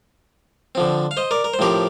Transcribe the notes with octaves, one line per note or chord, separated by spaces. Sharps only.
D3 F3 C4
F5
C5 D#5
A#4 D5
A#4
C5
A2 F3 C4 G4 A#4